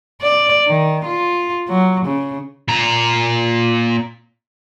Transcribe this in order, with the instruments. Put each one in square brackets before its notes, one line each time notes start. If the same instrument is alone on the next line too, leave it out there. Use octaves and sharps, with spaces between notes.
[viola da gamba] D5
D#3
F4
F#3
C#3
[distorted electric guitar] A#2 A#5